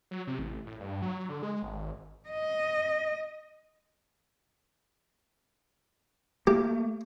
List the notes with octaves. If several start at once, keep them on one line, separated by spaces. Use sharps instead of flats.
F#3
C3
A1
A2
G2
F#3
D3
G#3
G#1
D#5
A3 A#3 G4